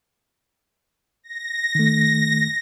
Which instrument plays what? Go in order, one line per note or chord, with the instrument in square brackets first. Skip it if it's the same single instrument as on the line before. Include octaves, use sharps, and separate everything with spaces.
[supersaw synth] A#6
[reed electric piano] D#3 A3